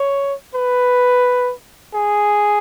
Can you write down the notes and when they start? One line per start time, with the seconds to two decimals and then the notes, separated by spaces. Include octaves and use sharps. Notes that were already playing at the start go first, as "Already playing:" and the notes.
Already playing: C#5
0.55 B4
1.94 G#4